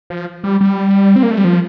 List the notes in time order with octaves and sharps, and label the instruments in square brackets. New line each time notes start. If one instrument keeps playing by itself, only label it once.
[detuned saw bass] F3
G3
G3
C4
A#3
A3
G3
F3